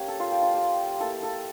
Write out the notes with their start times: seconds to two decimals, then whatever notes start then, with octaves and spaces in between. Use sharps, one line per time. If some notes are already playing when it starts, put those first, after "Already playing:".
Already playing: A#3 C#4 G4 C#5
0.08 A4
0.20 F4
0.31 G4
0.43 F4
0.54 G4
1.00 A#3 E4 A4
1.23 A4